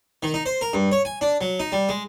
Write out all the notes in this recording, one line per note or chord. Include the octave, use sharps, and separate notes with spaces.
D#3
D#4
C5
A#4
G2
C#5
G#5
D4
F#3
D#4
G3
G#3